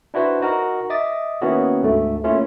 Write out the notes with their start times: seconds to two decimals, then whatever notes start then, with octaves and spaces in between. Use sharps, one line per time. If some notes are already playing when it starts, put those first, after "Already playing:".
0.14 D4 E4 F#4 B4 C5
0.41 D#4 F#4 A#4 A#5
0.90 D#5 E5 D6 D#6 A6
1.42 D#3 A#3 B3 C#4 E4 F#4
1.82 D2 G#2 D3 A3
2.24 A3 A#3 C#4 E4 F4